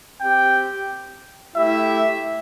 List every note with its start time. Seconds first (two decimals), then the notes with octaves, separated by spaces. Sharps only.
0.20 C4 G4 G5
1.56 A3 E4 G4 E5